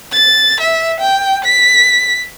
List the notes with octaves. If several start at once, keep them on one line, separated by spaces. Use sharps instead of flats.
A6
E5
G5
B6